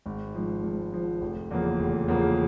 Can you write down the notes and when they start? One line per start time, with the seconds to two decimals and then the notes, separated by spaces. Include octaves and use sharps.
0.06 G#1
0.35 G#2 F3
0.63 G#1
0.93 G#2 F3
1.21 F1
1.51 E2 C#3 F3 A#3
1.80 F1
2.08 E2 C#3 F3 A#3